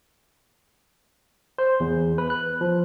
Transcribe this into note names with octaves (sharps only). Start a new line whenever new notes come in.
C5
E2
B4
F#6
F3